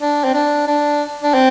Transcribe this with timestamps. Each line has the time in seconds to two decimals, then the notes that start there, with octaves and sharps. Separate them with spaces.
0.01 D4
0.24 C4
0.34 D4
0.67 D4
1.23 D4
1.34 C4